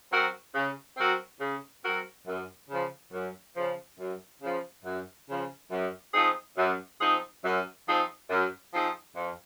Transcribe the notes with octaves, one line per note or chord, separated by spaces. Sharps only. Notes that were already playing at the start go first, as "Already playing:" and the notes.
F#3 C4 F#4 A#4
C#3
F#3 C4 F#4 A#4
C#3
F#3 C4 F#4 A#4
F#2
C#3 F3
F#2
C#3 F3
F#2
C#3 F3
F#2
C#3 F3
F#2
F3 C4 D#4 G#4
F#2
F3 C4 D#4 G#4
F#2
F3 C4 D#4 G#4
F#2
F3 C4 D#4 G#4
F2